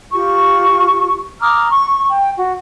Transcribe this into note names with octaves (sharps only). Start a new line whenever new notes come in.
F4 G4 C#6
A#5 D6 D#6 F6
C#6
G5
F#4